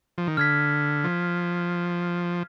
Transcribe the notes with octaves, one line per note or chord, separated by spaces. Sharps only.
F3
D#3
D3 F6 G#6 B6
F3